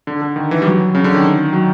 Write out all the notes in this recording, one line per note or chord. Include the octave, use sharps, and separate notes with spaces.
D3
D3
D#3
E3
G3
F#3
C#3
D3
D#3
F#3